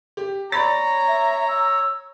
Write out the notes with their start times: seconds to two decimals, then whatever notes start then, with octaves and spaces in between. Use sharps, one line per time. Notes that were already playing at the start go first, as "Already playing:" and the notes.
0.17 G4
0.52 C#5 D5 A#5 B5 A6
1.08 E5
1.48 E6